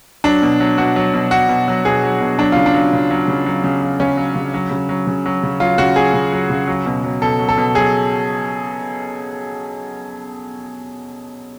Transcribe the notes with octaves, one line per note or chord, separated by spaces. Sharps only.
F#3 D4
B2
F#3
B2 F#4
F#3
B2
F#3 F#4
B2
F#3
B2 G#4
F#3
B2
F#3 D4
C#3 F4
D4
F#3
C#3
F#3
C#3
F#3
C#3
F#3
C#3 C#4
F#3
C#3
F#3
C#3
F#3
C#3
F#3
C#3
F#3 F4
C#3 F#4
F#3 G#4
C#3
F#3
C#3
F#3
B2
F#3
B2 A4
F#3
A4
B2
F#3 G#4